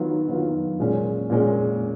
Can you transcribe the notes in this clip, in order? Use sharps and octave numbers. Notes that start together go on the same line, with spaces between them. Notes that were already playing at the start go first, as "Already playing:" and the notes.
Already playing: D#3 F#3 B3 F4
D#3 F#3 B3 F4
A#2 G#3 C#4
A#2 G#3 C#4